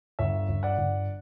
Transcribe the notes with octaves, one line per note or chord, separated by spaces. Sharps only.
G1 C#5 E5
G1
D5 F#5
G1